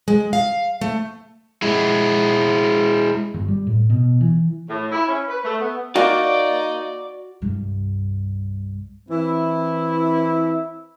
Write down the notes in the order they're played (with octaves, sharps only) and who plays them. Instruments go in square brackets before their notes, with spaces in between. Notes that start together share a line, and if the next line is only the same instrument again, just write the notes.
[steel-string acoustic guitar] G#3
F5
A3
[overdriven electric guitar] G#3 E4
[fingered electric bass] G1
G3
A2
B2
E3
[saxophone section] A2
E4
C#4
B4
A3
B3
[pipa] A#3 [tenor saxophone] D#4 [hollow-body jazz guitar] F#4 [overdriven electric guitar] D5
[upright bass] C2 G2
[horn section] E3 C4 E4